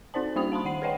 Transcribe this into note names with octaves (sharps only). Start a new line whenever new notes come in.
C4 D#4 C5 D5 A5
G3 A#3 D4 F#4 D#6 F7
F5 A5 B5 C6
D#3 F#5 C7 F#7
G#4 B4 C#5 D#5 F#5 G5